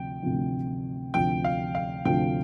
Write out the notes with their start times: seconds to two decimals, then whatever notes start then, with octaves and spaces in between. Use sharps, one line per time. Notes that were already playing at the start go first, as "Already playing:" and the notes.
Already playing: D2 C3 F3 G5
0.23 D2 C3 F3
1.14 D2 C3 F3 G5
1.44 F5
1.75 F5
2.05 D2 C3 F3 G5